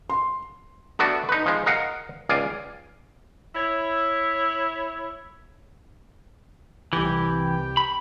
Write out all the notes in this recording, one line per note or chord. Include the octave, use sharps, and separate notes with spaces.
C6
A3 B3 D4 F#4
D#4 B4
F3 G#3
A#4 D#5 F5 F#5
C#2 D5 F5 G#5
E4 C#5
C2 E3 G4
B5